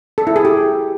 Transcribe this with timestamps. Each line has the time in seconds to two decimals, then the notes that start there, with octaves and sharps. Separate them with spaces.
0.18 A4
0.27 E4
0.36 G#4
0.45 G4